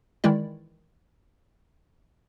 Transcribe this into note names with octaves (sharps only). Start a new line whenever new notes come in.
D#3 E3 G#3 E4 D5